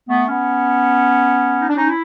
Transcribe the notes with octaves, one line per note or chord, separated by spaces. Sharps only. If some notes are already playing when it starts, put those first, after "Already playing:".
A3 B3
B3 C#4
D#4
D4
C#4 D#4
E4